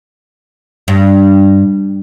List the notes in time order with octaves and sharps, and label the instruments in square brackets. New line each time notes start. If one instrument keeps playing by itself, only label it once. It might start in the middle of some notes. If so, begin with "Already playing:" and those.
[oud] G2